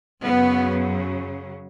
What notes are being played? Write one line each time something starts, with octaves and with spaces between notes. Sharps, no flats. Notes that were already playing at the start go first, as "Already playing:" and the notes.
F#2 C#3 F#3 B3